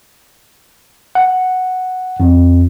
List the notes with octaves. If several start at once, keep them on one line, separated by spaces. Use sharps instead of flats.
F#5
F2